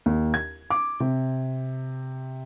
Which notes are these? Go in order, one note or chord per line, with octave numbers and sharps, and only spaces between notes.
D#2
G#6
D6
C3